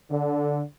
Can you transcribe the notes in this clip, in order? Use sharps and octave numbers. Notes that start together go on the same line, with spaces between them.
D3